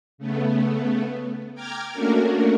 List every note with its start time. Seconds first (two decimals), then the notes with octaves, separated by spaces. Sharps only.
0.18 C#3 A3 B3
1.55 G5 A#5 D6 F6 G#6
1.93 A3 A#3 C#4 D4 F#4 A#4